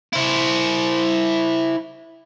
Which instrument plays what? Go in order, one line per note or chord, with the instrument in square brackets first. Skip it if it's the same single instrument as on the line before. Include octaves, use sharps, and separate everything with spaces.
[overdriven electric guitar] E4 C5